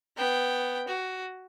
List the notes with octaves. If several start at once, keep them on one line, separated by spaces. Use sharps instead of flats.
B3 G5
F#4